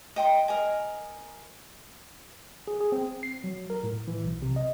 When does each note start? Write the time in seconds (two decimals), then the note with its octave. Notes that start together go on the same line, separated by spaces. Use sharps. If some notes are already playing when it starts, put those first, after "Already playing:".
0.16 D#5 G5 C6
0.48 A#4 D#5 G#5
2.67 G#4
2.80 G#4
2.92 C4
3.23 C7
3.44 F#3
3.70 A#4
3.83 A2
4.08 E3
4.24 B1
4.42 C3
4.56 D#5